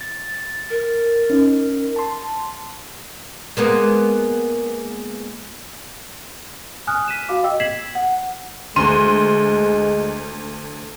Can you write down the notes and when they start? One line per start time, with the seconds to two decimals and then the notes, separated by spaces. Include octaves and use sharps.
0.01 A6
0.34 A6
0.70 A#4
1.30 C#4 D#4
1.96 A5 C6
3.57 G#3 A#3 B3
6.87 G#5 D#6 F6 F#6
7.08 B6 D#7 E7
7.29 F#4 F5 D6
7.44 D#5 G5 E6
7.60 G#6 B6 C7 E7 F#7
7.95 F#5
8.76 D2 G#3 C6 D#7